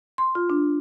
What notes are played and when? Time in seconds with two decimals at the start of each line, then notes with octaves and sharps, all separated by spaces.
0.18 C6
0.35 F4
0.50 D4